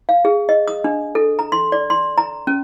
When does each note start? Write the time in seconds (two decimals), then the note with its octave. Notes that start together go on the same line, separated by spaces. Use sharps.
0.09 F5
0.25 G#4
0.49 D#5
0.68 D#6
0.84 D4
1.15 A4
1.39 A#5
1.52 C6
1.72 D5
1.90 C6
2.18 A#5
2.47 C#4